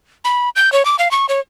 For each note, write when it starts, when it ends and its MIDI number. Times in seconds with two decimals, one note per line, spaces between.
0.25 0.49 83
0.56 0.72 91
0.72 0.85 73
0.85 0.96 86
0.99 1.11 77
1.11 1.26 85
1.29 1.40 73